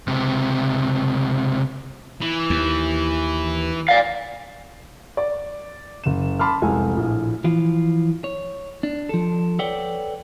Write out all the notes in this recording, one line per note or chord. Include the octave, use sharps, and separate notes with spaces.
C#2 C3
E3
D#2
D5 F5
D5
F#1 E7
A5 B5 C6 D6 F6
F1 C2 G#3 A4 G#5
A#1 A2
E3 F3 F4
C#5
D4
F3 A4
A4 B4 C#5 D5 F#5 G5